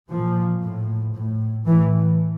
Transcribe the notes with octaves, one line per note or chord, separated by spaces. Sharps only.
A#2 F3
A2
A2
A2 E3